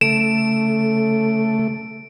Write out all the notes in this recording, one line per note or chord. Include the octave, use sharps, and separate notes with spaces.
C#3 A3 A4 D7 E7